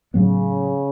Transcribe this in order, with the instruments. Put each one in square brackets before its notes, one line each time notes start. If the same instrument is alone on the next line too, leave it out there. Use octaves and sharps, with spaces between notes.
[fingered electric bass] A2 F#3 B3 [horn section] C#3